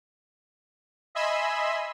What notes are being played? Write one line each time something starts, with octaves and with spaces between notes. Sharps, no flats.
D#5 E5 G#5 B5 C6 E6